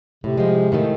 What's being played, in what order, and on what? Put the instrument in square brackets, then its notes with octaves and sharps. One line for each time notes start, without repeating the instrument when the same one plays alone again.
[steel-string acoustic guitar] A2 [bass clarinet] C3
[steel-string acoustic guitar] F3 G#3
A2 D#3 A3